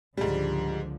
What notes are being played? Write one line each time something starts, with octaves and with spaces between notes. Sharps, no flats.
C#2 G#2 D3 F3 G3